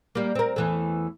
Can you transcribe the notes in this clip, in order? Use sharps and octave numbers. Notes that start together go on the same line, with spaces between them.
G3 A#3
C4 A#4
E2 E3 A3